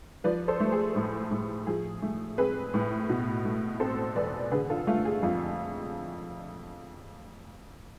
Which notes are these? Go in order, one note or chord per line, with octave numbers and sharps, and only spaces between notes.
F3 B4 D5
A4 C5
A3
G#4
A2
A2
F3 G#4
A3
C4 G#4 B4
A2
B2
A3
C4 A4 C5
E2 B4 D5
D3 G#4 B4
F4 A4
A3 F4
G#4
F2 F4